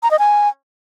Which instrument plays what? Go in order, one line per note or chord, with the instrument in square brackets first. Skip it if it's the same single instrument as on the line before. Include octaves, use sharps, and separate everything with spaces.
[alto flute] A#5
D#5
G#5